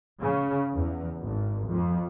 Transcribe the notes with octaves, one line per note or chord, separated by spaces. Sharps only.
C#3
E2
G#1
F2